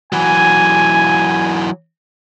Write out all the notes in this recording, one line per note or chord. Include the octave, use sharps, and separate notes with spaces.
E3 F#3 G#5